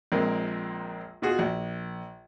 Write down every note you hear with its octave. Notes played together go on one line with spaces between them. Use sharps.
A#1 A#2 G#3 C4 A#4
B2 F4 F#4 G#4
A#1